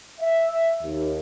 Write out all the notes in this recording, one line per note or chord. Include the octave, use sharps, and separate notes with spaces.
E5
D#2